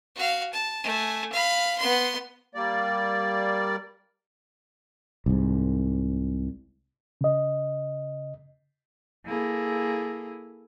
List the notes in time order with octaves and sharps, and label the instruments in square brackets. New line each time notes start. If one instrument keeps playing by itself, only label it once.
[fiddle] F#4 F5
A5
A3 G#5
F5 B5
B3 C6
[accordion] G3 A#3 D5
[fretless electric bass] C2 G#2
[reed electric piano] C#3 D#5
[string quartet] A#3 E4 G#4 A4